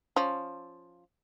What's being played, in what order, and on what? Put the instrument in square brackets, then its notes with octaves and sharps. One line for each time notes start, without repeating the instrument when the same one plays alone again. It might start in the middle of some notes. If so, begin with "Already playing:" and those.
[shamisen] F3 C#4